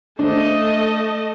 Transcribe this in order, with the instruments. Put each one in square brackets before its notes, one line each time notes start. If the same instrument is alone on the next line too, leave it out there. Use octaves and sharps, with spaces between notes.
[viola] A3 D#5 [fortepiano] D4 C5